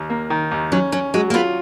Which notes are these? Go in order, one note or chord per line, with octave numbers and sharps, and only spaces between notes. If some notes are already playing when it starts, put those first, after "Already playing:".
Already playing: D#2
A#3
D#3
D#2
F#3 C#4
F#3 C#4
F#3 G#3
A#3
B3 F4